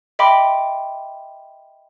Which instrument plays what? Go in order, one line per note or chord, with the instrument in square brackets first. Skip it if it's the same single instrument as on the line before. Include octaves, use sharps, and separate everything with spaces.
[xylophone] D#5 E5 G5 B5 C6 D6